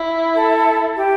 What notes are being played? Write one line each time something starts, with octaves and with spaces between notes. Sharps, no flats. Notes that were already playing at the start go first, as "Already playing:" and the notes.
Already playing: E4
A4
G4